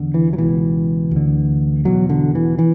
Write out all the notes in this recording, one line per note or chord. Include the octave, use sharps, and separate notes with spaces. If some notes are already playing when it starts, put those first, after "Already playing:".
Already playing: E2 D3
E3
F#3
C#2 B2 E3
D2 D3
E2 B2 F#3
D3
E3
E3